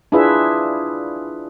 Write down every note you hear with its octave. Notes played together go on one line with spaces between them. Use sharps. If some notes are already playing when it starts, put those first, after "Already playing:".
D4 E4 F4 G#4 B4 E5